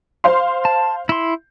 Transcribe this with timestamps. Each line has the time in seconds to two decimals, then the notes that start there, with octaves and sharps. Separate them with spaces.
0.24 C5 F5 C6
0.65 A5
1.09 E4 C6